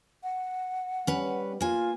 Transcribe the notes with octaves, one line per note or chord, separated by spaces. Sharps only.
F#5
G3 C#4 B4
A#3 F4 G#5